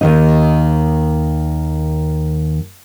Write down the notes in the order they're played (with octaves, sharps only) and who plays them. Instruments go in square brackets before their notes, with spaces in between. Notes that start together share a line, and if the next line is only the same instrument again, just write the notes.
[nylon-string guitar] D#2 D#3 D#4